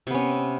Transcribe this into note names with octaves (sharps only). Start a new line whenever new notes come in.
C3 B3 C#4